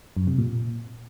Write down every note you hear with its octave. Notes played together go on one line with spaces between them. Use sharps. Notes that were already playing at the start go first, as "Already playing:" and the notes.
F#2
C3
A#2